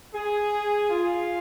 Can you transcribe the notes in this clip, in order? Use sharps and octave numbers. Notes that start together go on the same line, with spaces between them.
G#4
F4